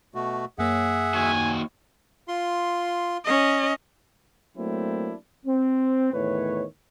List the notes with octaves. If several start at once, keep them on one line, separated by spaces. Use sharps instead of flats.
B2 A3 F#4
F#2 A#3 G#4 C#5 E5 F#5
D#2 F#4 G#5
F4 C6
C#4 D#5
F#3 A3 A#3 C4 D4 E4
C4
E2 A2 D#3 B4 C#5